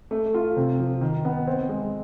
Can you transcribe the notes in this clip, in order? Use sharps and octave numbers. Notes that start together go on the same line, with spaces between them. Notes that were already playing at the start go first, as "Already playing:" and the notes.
A3
F4
C3
F3
D#3
B3
C4
G#3